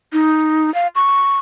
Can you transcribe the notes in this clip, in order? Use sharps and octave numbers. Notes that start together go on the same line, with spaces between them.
D#4
F5
C#6